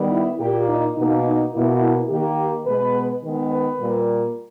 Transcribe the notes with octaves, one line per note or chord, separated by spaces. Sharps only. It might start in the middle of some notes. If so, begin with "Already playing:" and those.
Already playing: D#3 G3 B3
E4
A#2 A#3 G4
D#4
B2 A#3 D#4
D#4
B2 A#3 E4
D#3 A#3 G4
B2 G#3 B3 B4
D#3 G#3 B3
B4
A#2 G3 A#3